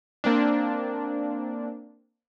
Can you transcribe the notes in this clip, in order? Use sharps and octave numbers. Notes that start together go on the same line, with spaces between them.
A#3 C4 D4